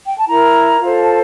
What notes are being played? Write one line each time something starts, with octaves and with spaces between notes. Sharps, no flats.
G5
A5
E4 A#4 A#5
F4 A4 C5
A5